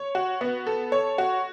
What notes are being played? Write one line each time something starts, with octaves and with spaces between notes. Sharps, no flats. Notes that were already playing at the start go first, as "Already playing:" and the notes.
Already playing: C#5
F#4
B3
A4
C#5
F#4